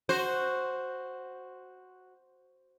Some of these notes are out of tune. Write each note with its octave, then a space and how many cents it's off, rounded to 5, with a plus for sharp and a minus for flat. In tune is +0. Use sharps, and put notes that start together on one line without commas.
F#4 +0 C5 +0